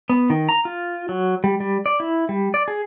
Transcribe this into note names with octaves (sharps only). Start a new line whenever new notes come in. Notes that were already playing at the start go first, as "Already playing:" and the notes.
B3
D#3
A#5
F4
F#3
G3
G3
D5
E4
G3
D5
G#4